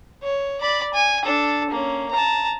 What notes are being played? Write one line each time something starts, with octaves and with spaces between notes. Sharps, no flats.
C#5
D5 B5
G#5
D4 A4
A#3 C#4
A5 A#5